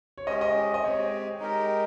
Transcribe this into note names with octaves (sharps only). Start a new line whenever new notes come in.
C#5
G#3 C#4 G4 D#5
D#5
D#5
G#3 C4 G4 C#5
G#3 D#4 G4 A#4